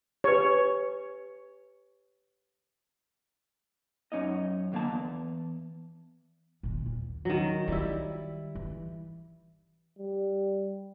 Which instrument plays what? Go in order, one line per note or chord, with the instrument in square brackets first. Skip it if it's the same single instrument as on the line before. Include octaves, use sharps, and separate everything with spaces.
[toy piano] G4 B4 [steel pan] C#5
[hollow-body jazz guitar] F#2 C#4 D#4 D#5
D#2 A2 D3 A#3 A5
E2
[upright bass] A#2 D#3
D#2
[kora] D#3 F#3
[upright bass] D#3 [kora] G3 E4
[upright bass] E3
[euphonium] G3